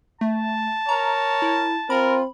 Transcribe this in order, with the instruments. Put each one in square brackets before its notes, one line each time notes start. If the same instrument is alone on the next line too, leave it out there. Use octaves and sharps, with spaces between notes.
[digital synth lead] A3 [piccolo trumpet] A5
[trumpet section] A#4 C#5 [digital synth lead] A#5
[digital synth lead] E4
[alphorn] C4 [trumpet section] F4 A#4 [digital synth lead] B5